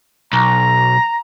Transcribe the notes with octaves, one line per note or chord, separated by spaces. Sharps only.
B1 A#5